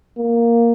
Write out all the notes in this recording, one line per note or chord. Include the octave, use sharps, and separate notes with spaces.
A#3